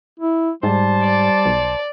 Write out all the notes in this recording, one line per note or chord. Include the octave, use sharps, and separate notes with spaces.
E4
G#2 G3 C5 A5
D5
B1